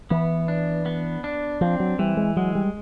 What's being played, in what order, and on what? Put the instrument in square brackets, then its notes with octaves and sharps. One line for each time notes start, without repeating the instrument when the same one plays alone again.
[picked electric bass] E3 [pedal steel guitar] B3
[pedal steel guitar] D4
B3
D4
[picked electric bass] F3 [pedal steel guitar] C4
[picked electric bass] F#3
[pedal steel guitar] E3 [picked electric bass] G3
[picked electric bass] G#3
[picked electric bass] F#3 [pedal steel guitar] G#3
[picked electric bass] G3